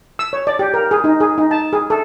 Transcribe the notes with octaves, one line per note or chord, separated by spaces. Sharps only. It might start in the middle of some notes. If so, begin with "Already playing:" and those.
E6
C#5
D5
G4
A#4
G#4
D#4
G#4
D#4
A5
G#4
A4